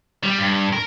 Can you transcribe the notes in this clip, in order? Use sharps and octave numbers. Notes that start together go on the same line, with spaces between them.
G3
G2
A#4